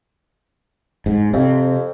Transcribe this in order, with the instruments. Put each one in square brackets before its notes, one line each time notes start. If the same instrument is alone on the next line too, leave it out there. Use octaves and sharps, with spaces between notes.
[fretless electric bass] G#2
[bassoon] F2 [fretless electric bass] C3